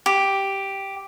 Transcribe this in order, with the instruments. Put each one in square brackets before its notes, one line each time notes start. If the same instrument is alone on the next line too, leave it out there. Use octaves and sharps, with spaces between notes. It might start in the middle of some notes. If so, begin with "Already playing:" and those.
[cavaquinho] G4